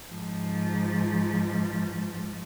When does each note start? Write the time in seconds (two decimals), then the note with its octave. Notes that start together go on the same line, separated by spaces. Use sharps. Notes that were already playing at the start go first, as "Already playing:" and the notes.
0.11 G#2 F3